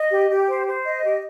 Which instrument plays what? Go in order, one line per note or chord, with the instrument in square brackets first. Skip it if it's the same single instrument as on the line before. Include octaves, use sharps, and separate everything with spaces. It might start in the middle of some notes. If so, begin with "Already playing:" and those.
Already playing: [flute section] D#5
G4
G4
C5
C5
D#5
G4